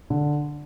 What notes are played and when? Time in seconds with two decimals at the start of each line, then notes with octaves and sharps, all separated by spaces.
0.10 D3